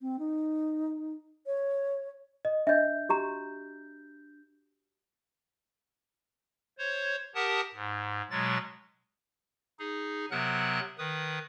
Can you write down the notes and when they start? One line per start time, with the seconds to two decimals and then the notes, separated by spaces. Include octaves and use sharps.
0.01 C4
0.19 D#4
1.46 C#5
2.45 D#5
2.67 D4 D#5 E5 G6
3.09 F#4 G4 A#5
6.78 C5 C#5
7.35 G4 A#4 F#5 A5 D#6
7.74 G#2
8.30 B2 F#3 G#3 A6
9.79 D#4 G#4
10.31 C3 F#3 B3 A#4 F#5 F#6
10.99 D#3 B4 D#6